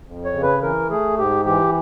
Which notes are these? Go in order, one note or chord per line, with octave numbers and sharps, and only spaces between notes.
F2
C#5
C#3
B4
E3 A#4
A3 G#4
G#2 G4
E3 G4